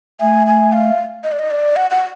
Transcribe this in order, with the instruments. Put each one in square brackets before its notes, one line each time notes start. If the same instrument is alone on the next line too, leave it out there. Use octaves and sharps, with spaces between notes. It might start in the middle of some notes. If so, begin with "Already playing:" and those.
[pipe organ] A3 [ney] G#5
[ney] G#5
F5
D#5
D5
D#5
D5
F#5
F#5